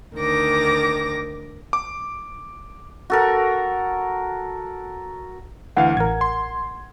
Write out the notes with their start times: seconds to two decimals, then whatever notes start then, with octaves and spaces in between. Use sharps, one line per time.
0.15 D2 D#3 D6 A#6
1.73 D6
3.10 F#4 A4 A#4
5.77 D2 E3 F5 F#5
5.97 A1 A#4 G#6
6.21 C6